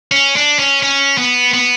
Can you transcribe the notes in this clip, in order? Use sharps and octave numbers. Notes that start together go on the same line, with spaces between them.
C#4
D4
C#4
C#4
B3
B3